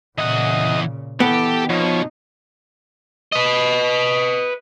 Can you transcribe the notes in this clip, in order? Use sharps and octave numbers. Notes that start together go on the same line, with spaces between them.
A#2 C#3 E3 D#5 F#5
E3 B3 G4 A4
B2 F3 D#4 C#5
B4 D#5